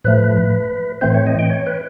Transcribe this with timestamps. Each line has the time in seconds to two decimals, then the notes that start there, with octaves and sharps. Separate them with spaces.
0.04 A2 F3 A3 B4
1.01 A2 E3 A3 C4 C5
1.14 C#5
1.27 D#5
1.39 G5
1.50 C#5
1.67 B4